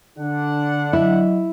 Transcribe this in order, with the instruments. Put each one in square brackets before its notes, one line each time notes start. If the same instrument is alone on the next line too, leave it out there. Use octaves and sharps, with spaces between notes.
[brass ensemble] D3 D4 F#5
[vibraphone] F#3 D#5 [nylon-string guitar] E4